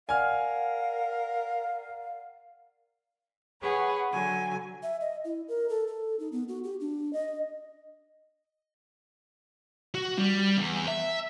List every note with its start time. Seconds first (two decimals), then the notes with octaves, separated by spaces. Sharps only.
0.09 A#4 D5 F5 F#5 G#5 F6
3.61 G#4 B4 C#5 F#5
4.11 D3 F#3 G#5
4.83 E5
5.01 D#5
5.24 E4
5.48 A#4
5.69 A4
5.87 A4
6.19 D#4
6.32 B3
6.48 F#4
6.64 G4
6.80 D4
7.13 D#5
9.94 F#4
10.19 G3
10.57 E2
10.88 E5